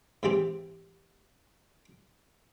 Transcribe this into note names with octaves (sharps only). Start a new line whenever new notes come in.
G#2 C3 E3 C4 G4